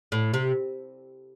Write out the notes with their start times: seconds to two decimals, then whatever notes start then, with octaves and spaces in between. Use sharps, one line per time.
0.12 A2
0.34 C3